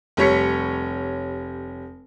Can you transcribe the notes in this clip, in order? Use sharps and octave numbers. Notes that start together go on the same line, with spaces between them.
F1 G3 C#5 B6 C#7